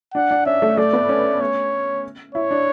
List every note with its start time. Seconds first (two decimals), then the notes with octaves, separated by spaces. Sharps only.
0.14 D4 F#5
0.31 D4
0.46 C#4 E5
0.62 A3
0.77 A3 D5
0.93 B3
1.09 C#4
1.41 C#5
2.35 E4 C#5
2.51 D4